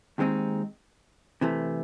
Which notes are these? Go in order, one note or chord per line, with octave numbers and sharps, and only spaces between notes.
D#2 D#3 G#3 C4 D#4
C3 E3 A3